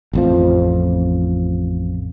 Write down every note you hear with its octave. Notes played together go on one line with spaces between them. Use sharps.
A1 F2 F3